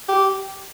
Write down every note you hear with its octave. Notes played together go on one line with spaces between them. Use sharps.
G4